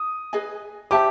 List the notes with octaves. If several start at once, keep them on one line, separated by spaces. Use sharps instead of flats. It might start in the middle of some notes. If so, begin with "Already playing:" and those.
Already playing: D#6
G#4 B4 D#5 G#5
G4 C5 E5 A5 D6